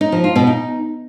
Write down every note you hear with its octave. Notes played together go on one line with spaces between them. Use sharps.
D#4
F3
F4
B2
D#4